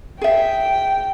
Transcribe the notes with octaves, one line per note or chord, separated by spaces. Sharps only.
G#4 E5 G5